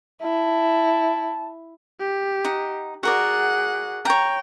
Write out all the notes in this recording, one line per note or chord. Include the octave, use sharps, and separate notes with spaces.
E4 A5
G4
D#4 F#5
F#4 G#4 A#4 D5 F#5
C#5 G5 A#5